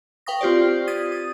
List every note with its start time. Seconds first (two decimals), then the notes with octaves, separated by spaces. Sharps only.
0.26 B4 F5 G5 C#6 D#6 A#6
0.41 C4 F4 G4 C5 D5
0.87 D#6 G#6 A6 B6 D#7
1.12 D#6